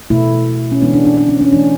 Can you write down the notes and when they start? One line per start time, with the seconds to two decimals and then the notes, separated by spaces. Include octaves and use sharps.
0.10 B2 A3 E4
0.72 C#4
0.82 E3 G#3 B3 D4
0.93 D4
1.05 D4
1.17 D4
1.29 C#4
1.41 C#4
1.52 E3 A3 D4